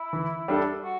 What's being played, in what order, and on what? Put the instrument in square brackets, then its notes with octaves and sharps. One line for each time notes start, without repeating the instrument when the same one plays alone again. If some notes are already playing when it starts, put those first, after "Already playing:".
Already playing: [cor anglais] E4
[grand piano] E3
G3 D4 A4
[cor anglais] F#4